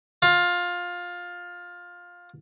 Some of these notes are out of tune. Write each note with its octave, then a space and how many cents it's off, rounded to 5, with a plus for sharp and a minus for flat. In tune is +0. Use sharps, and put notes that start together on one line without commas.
F4 +15